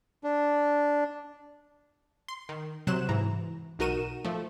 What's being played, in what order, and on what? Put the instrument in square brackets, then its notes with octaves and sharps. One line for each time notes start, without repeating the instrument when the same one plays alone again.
[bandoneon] D4
[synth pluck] C6
D#3
C3 F#3 C5 F#6 E7
G#2 E3 A#5
B1 D#4 F#4 A#4 D#7 E7
F3 A3